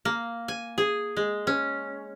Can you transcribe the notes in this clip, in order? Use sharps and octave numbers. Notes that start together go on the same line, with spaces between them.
A#3
G#5
G#4
G#3
C#4